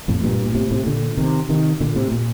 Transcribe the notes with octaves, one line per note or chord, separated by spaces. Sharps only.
F2 A2
G2 A#2
A#2
A2 C3
A2 C3
A#2 D3
C3 D#3
C3 D#3
A#2 D3
A2 C3
A#2